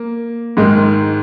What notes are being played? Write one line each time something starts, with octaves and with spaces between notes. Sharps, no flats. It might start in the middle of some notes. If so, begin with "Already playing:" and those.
Already playing: A#3
G#2 D#3 G#3